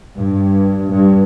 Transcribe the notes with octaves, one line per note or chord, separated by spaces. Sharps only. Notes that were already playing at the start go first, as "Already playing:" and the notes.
G2
G2